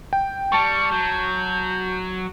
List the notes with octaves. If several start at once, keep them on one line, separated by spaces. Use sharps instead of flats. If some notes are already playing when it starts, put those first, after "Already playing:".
G5
G3 A5 C#6 C#7
F#3 G6